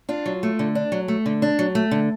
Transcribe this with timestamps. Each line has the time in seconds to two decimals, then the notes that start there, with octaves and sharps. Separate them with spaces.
0.09 D4 F4
0.26 F#3
0.43 A3
0.59 D3
0.75 D4
0.92 F#3
1.08 A3
1.26 D3
1.42 D4
1.59 F#3
1.75 A3
1.91 D3